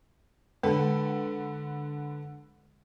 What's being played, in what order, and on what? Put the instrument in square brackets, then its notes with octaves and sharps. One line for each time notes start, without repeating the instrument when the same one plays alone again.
[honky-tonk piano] D3 A4 B4 [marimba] G#3